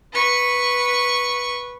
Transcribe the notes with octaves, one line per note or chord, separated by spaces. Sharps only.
B4 C#6